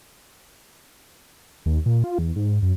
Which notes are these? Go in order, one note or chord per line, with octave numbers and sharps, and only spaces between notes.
D#2
A#2
F4
E2
G#2
F#2